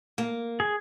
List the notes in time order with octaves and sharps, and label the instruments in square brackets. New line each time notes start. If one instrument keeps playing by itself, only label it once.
[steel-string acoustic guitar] A#3
[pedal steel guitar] G#4